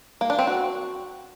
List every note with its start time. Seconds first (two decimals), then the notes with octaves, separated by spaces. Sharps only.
0.21 A#3
0.30 D4
0.39 C4
0.47 F#4